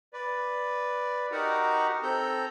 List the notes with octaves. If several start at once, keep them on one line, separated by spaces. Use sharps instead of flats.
B4 D5
D#4 F#4 G4 A#4 F#5 A#5
C4 A4 A#5 G6